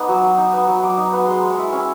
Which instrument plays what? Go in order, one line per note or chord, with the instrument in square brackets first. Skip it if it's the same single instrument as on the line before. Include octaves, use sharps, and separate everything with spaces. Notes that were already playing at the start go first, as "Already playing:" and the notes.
Already playing: [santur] B3 D#4 D6
F#3
F#3
D#4
B3
F#3
F#3 D6
D#4
B3
G#3 C6
G#3
C#6
E4
C#4